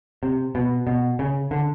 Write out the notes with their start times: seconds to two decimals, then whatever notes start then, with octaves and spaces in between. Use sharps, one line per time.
0.23 C3
0.55 B2
0.87 B2
1.19 C#3
1.51 D3